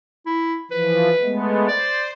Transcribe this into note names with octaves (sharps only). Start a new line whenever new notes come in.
E4
E3 F3 B4
G#3 A3 B3
C5 D5